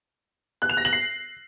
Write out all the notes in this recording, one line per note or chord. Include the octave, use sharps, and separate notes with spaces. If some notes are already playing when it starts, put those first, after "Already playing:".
F#6
F7
A#6
F#7
C7